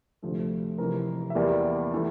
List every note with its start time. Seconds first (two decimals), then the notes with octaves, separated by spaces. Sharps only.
0.22 D2 C3 F3 A3
0.78 F1 F2 E3 G3 A#4
1.30 E5
1.35 E2 E3 G3 A#3 D5
1.94 E3 A3